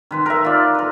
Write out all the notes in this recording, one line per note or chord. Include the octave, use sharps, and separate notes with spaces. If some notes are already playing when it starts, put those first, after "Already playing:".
D#3 B4 C6
A#4 E5
F4 D5
A#4 B4